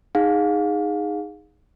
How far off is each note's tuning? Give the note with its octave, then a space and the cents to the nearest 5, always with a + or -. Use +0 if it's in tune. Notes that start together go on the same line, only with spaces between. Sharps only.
D#4 +5 G#4 -15 F5 +30